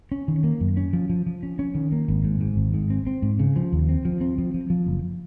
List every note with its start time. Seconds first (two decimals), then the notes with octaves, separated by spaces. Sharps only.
0.12 C#4
0.28 D#3
0.44 A#3
0.61 F#2
0.77 C#4
0.93 F3
1.09 F3
1.27 F3
1.43 C#4
1.59 C#4
1.75 D#3
1.92 A#3
2.08 G#1
2.24 G#2
2.41 G#2
2.57 G#1
2.74 G#2
2.90 C4
3.07 C4
3.22 G#2
3.39 C#3
3.56 F3
3.72 D#2
3.89 C4
4.05 F3
4.21 C4
4.38 F3
4.54 F3
4.70 F3
4.86 F#1